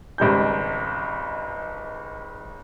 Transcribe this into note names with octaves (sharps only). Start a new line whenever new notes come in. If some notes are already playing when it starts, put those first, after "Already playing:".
G#1 C#2 G3 G6